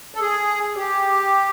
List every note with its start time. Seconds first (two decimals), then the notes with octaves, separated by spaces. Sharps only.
0.15 A4
0.20 G#4
0.77 G4